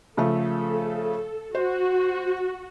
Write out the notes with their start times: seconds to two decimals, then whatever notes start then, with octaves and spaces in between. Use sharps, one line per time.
0.17 C#3 F3 A3 A4
1.55 F#4 C5